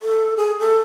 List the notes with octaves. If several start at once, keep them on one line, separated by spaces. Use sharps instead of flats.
A4
G#4
A4